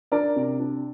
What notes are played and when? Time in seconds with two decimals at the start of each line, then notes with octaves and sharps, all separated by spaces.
0.12 D4 A#4 D5
0.36 C3
0.60 D4